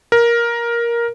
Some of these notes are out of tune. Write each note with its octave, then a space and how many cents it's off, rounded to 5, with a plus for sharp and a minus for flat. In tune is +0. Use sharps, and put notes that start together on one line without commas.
A#4 +10